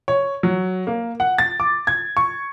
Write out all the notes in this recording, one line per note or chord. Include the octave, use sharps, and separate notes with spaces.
C#5
F#3
A#3
F#5
A6
D6
G#6
C#6